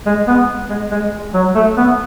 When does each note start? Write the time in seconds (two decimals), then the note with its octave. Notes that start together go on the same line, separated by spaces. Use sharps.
0.06 G#3
0.27 B3
0.70 G#3
0.91 G#3
1.34 F#3
1.55 A3
1.77 B3